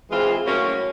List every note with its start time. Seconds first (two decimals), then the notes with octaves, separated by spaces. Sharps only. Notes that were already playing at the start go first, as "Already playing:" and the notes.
0.11 E3 G#3 C4 F4 G#4
0.46 A2 F#3 A#3 C#4